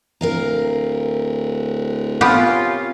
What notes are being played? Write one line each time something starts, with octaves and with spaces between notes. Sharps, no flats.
D1 A#4 F5 A#5
C3 B3 C#4 F4 G4